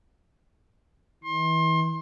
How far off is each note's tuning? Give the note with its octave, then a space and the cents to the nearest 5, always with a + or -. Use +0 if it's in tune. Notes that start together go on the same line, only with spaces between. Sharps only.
E3 -35 C6 +30